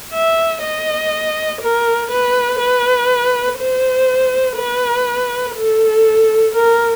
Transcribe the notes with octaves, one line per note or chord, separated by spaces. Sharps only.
E5
D#5
A#4
B4
B4
C5
B4
A4
A#4